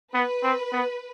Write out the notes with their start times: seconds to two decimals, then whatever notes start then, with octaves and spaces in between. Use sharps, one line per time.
0.14 B3 B4
0.43 C4
0.72 B3